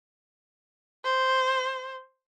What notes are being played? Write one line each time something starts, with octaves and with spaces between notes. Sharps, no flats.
C5